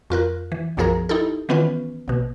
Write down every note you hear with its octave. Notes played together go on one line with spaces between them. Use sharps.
F2 F4 A#4 F#6
E3
B1 F#2 F3 G#4 A#4 A#5
D#4 E4 G4 A4
D#3 E3 B3 C#4 F4 B4
A#1 B2